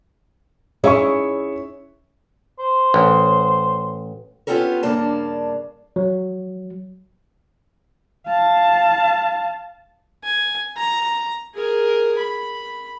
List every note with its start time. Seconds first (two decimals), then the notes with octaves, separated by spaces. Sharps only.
0.84 C#4 D#4 E4 G#4 E5 C#6
2.59 C5
2.94 A1
4.47 B3 C#4 F4 G4 A4 A#4
4.83 G2 C#3 A#3 D4 D5 A5
5.96 F#3
8.27 F5 A5
10.24 G#5
10.77 A#5
11.55 G#4 A#4
12.18 B5